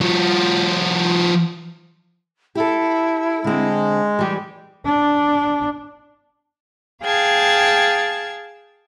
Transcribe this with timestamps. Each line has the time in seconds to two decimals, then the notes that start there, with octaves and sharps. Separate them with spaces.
0.01 F3 F#4
2.55 E4 G4 A4
3.44 D3 G#3 C4
4.19 E3 G3 G4
4.86 D4
7.03 G#4 F5 G5 A5 G#6